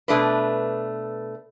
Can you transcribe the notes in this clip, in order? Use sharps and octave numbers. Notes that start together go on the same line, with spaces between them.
B2 A3 D4 B4